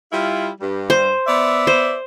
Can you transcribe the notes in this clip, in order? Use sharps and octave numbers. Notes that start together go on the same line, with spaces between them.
G3 E4 F4
G2 G3
C5
B3 D5 E5
C5